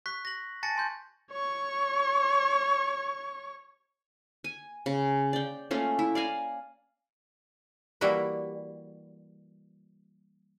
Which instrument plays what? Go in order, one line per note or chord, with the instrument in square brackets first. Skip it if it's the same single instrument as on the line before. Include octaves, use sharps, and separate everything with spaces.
[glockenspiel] C#6 F#6 B6
A#6 F#7
G#5 A5 A6 A#6 C#7
G#5 C6 G6
[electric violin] C#5 C#6
[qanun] G#5
C#3
D5 G5
A3 A#3 C#4 F4
E4
D5 F5 G#5 A#5
[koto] E3 G3 A#3 E4 F#4 B4